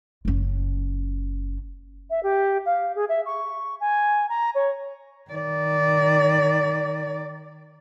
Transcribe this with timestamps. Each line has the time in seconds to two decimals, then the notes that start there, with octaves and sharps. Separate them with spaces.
0.25 F#1 C#4
2.10 E5
2.23 G4
2.66 F5
2.96 G#4
3.09 E5
3.26 C#6
3.80 G#5
4.29 A#5
4.55 C#5
5.31 D#3 D5